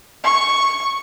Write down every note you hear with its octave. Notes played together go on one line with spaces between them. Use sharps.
C#6